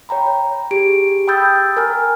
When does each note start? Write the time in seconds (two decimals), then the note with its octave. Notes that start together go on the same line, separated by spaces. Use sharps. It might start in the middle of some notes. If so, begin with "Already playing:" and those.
0.09 C#5 G5 A#5 B5
0.71 G4 G#4 D7
1.27 G5 B5 D#6 E6 G6 A6
1.77 A#4 G#5 A#5 F6